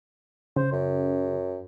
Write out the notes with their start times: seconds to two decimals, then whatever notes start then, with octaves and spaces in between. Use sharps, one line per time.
0.56 C#3 C5
0.72 F#2